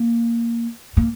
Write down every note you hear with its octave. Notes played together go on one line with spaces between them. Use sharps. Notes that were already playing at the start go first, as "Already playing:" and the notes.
Already playing: A#3
A#3